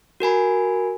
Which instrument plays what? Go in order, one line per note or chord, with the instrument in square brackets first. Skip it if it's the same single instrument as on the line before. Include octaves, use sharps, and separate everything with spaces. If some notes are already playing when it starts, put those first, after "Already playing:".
[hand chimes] F#4 A#4 G#5 B5